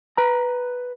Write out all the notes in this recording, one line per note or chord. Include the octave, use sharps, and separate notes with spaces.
B4 A#5